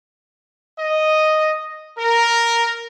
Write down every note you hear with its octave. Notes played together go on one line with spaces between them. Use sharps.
D#5
A#4